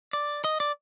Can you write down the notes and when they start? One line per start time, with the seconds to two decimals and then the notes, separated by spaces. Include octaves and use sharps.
0.13 D5
0.44 D#5
0.60 D5